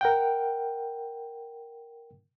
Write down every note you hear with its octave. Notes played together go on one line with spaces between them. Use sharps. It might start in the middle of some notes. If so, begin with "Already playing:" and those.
A#4 F#5 G5